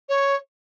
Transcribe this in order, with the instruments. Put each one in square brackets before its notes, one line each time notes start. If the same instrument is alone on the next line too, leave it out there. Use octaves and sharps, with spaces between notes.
[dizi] C#5